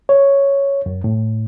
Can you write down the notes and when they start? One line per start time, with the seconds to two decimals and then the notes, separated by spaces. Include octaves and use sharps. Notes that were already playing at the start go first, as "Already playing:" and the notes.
0.09 C#5
0.86 F#2
1.04 A2